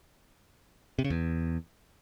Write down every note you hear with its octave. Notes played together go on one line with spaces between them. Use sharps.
C3
C#3
E2